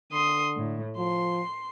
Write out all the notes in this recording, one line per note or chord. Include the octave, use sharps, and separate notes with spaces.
D3 C6 D#6
A2
F3 C6